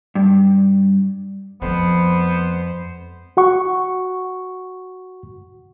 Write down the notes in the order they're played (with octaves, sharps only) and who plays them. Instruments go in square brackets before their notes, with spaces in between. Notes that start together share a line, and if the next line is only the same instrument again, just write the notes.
[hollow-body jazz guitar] G2
[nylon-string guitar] F2 [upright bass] F3 G#3 [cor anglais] B3 [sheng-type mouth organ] C5
[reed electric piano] F#4 F#5 C#6